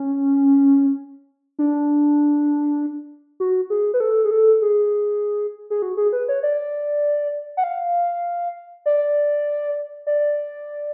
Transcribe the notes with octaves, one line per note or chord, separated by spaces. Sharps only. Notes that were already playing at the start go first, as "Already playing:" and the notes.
Already playing: C#4
D4
F#4
G#4
B4
A4
G#4
A4
G#4
G#4
F#4
G#4
B4
C#5
D5
F#5
F5
D5
D5